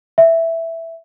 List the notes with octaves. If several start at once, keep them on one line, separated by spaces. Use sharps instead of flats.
E5